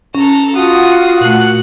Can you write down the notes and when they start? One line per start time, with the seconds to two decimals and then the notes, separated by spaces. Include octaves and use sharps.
0.15 C#4 A4 A#5
0.55 F4 F#4 F#5 D#6
1.21 A#2 A3 F#6